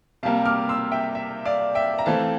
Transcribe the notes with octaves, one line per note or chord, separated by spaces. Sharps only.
C3 G3 A#3 F5 A5
D6 F6
C6 E6
E5 G5
E5
D5 F5
E5 G5
A#5
E3 A3 C4 F5 A5